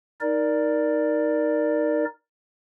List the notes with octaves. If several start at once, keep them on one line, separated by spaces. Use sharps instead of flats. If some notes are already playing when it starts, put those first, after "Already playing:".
D#4 A#4 D5